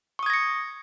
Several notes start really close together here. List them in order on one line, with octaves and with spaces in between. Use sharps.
C#6 D#6 G#6 A#6 C#7